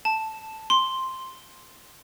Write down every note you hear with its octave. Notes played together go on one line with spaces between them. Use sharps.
A5
C6